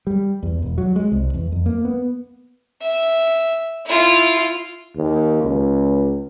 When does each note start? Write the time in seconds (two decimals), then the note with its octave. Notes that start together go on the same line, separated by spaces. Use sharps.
0.07 G3
0.43 E2
0.62 E1
0.78 F#3
0.96 G#3
1.12 C2
1.34 E2
1.52 F2
1.66 A#3
1.85 B3
2.81 E5
3.86 E4 F4
4.96 D#2
5.42 C#2